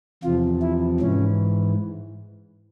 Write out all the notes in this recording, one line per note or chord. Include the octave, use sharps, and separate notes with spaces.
E2 C3 F3 F4
E4
G#2 E3 C#4